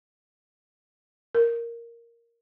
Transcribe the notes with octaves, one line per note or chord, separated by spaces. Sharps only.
A#4